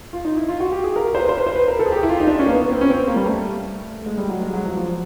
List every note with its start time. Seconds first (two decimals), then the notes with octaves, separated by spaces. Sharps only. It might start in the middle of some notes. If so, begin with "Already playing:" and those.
0.13 F4
0.25 D#4
0.37 E4
0.49 F4
0.60 F#4
0.72 G4
0.84 G#4
0.96 A#4
1.15 C5
1.20 B4
1.29 C5
1.38 B4
1.47 C5
1.56 B4
1.68 A#4
1.79 A4
1.86 G#4
1.92 G4
2.03 E4
2.09 F4
2.20 D#4
2.27 D4
2.39 C#4
2.46 A#3
2.50 B3
2.63 B3
2.72 C4
2.81 C#4
2.90 C4
2.99 B3
3.07 A#3
3.16 G3
3.26 A3
4.06 G#3
4.18 G3
4.29 F#3
4.41 G#3
4.54 F#3
4.66 F3
4.77 F3